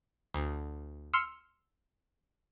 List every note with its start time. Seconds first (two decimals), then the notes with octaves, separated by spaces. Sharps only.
0.34 D2
1.13 C6 E6 F6 C#7